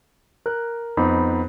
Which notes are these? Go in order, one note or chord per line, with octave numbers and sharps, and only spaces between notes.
A#4 F#6
F2 B3 D#4 B5